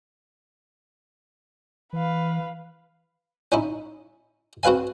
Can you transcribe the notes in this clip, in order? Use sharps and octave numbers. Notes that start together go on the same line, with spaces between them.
E3 B4 F5
C#4 D#4 E4
C4 F#4 B4 F5 G#5